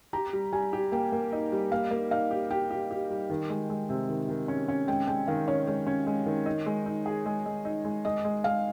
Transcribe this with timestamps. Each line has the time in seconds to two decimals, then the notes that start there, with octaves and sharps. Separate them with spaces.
0.13 G4 A#5
0.33 G3
0.53 G3 G#5
0.73 G4
0.92 A#3 G5
1.12 A#3
1.32 D#4
1.52 G3
1.71 A#3 F5
1.91 A#3
2.11 D#4 F5
2.31 G4
2.51 G4 G5
2.71 G4
2.91 G4
3.10 G3
3.30 D#3
3.50 G#3
3.70 G#3
3.89 C3
4.09 D#3
4.28 D#3
4.48 C#4
4.68 C#4
4.88 G#3 G5
5.07 G#3 G5
5.27 D#3 F5
5.48 C#4 C#5
5.67 G#3 C#5
5.87 C#4
6.07 G#3
6.26 D#3
6.46 D#4
6.66 G#3
6.86 D#4
7.06 G#4
7.26 G#3
7.46 G#3
7.65 D#4
7.85 G#3
8.05 G#3 D#5
8.25 G#3
8.44 G#3 F5